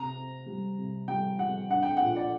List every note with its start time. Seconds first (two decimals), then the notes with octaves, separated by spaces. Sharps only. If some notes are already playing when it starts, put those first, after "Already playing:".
Already playing: C3 A#5
0.16 C4
0.46 G3
0.78 C3
1.08 G3 G5
1.39 G3 F#5
1.69 D4 F#5
1.83 G5
1.97 A#2 F#5
2.16 D5